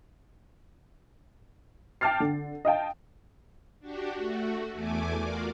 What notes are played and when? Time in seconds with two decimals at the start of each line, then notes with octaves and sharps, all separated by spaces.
2.01 G5 A5 D6 F6 A6 C7
2.20 D3
2.65 D#5 F5 G5 A5
3.80 D4 F#4 G4
4.12 A3 F#4
4.72 E2 A3 G#5 D6
5.19 F4 F#4 A#4 D5 F5